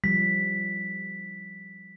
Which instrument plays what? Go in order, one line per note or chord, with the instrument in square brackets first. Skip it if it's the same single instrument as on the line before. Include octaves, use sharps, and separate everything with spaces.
[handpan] F3 G3 [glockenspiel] B6